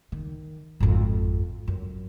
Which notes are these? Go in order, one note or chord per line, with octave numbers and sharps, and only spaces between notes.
D#3
G#1 F2
F#2